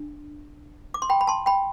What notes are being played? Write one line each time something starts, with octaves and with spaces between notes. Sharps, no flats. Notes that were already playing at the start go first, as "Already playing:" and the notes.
Already playing: D4
D6
C6
G5 B5
B5
A5 C6
G5 B5